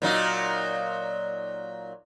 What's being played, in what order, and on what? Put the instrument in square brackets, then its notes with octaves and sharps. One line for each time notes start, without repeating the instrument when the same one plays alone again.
[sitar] A#2 F#3 D#4